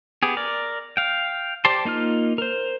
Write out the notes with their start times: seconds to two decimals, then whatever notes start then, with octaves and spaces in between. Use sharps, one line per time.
0.23 B3 G4 G#4
0.37 A#4 D5
0.97 F5 G5
1.65 G4 C5 D5 A5 C6
1.85 A#3 D#4 F4 F6
2.38 A#4 C5